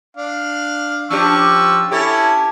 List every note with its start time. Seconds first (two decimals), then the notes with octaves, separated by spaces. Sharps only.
0.17 D4 F5
1.10 F3 C#4 D4 G4 C#6 E6
1.91 C#4 E4 G4 A4 C#5